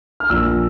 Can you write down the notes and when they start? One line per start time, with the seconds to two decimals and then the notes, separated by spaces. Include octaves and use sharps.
0.20 F6
0.30 A#1 E6